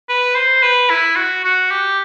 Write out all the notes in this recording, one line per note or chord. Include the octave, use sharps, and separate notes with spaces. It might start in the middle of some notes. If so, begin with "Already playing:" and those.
B4
C5
B4
E4
F#4
F#4
G4